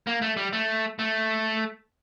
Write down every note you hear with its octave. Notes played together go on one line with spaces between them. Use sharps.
A#3
A3
G3
A3
A3